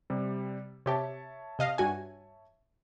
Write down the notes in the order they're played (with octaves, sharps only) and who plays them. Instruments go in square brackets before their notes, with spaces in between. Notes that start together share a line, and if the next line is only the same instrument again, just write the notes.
[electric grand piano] C3 G3
[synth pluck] C3 G4 [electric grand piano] C#5 E5 A5
[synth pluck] C3 D#5 F5
G2 F#4 G#5